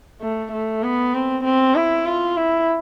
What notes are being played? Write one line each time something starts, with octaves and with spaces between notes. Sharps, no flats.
A3
A3
B3
C4
C4
E4
F4
E4